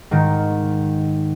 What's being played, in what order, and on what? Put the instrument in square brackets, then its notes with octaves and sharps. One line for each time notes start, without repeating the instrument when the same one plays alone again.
[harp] G#2 D#3